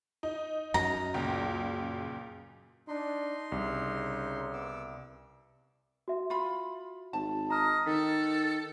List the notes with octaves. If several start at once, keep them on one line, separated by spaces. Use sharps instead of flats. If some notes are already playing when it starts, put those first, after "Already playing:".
D#4
F#2 A#5
C#2 A#2
D4 D#4 C6
C2 C#3
B3 D6 E6
F#4 E5
F4 B5
G#1 A5
D#5 A#5 F6
D#3 A4 B6